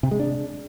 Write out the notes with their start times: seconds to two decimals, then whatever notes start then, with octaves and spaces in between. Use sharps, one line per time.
0.03 C3
0.11 G#3
0.19 D4